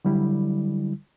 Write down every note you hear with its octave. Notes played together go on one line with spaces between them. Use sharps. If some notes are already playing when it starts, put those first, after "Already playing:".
D3 F#3 G3 E4